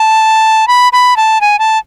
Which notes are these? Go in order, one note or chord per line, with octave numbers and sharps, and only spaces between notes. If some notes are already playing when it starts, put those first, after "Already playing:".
Already playing: A5
B5
B5
A5
G#5
A5